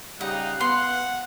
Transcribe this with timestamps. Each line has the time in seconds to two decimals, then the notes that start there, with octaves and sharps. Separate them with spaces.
0.21 C#3 G3 D#4 F5 F#5 F#6
0.60 B3 F#5 C6